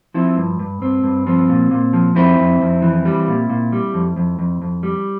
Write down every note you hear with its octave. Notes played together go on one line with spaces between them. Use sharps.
F3 C4 E4
G2
G2
G2 C4
G2
F3 C4
A#2
A#2
F3
F2 C4 E4
F2
F2
E3
G3
A#2
A#2
G3
F2
F2
F2
F2
G3